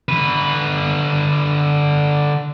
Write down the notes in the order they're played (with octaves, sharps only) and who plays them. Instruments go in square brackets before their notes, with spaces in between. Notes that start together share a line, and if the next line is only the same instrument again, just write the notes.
[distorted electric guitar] D3 B4